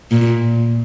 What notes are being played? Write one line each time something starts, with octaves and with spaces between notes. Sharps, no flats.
A#2